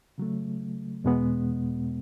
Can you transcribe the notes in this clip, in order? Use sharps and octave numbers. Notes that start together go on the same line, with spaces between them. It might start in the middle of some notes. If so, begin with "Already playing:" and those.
C#3 F#3 A3
E2 B2 G#3 B3